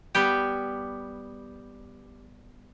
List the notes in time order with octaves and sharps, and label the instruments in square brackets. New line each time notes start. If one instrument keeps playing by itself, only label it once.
[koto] G3 B3 G4